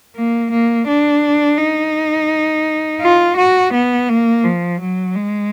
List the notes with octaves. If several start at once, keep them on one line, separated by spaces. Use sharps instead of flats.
A#3
A#3
D4
D#4
F4
F#4
B3
A#3
F3
F#3
G#3